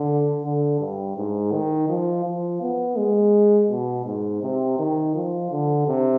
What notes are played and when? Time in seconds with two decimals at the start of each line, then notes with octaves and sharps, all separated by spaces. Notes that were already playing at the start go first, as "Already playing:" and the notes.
Already playing: D3
0.44 D3
0.81 G2
1.17 G#2
1.53 D#3
1.89 F3
2.25 F3
2.62 B3
2.98 G#3
3.70 B2
4.06 G#2
4.43 C3
4.79 D#3
5.15 F3
5.51 D3
5.87 C3